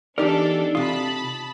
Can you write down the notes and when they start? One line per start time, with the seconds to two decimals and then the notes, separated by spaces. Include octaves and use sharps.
0.18 E2 D4 D#4 G4 A4 A#4 D5
0.75 C3 F4 A5 B5 D#6